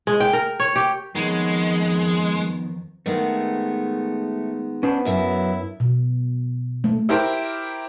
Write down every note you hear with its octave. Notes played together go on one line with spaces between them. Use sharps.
G#3
G5
A#4
C#5
G4
F2 D#3 G#3 B3 C#5
D#3 G#3 A3 B3
B3 C#4 D4 C5
F#2 F#3 E4 E5
B2
A3
E4 G4 A#4 C5